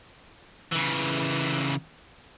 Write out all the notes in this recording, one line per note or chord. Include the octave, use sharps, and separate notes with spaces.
C#3 E3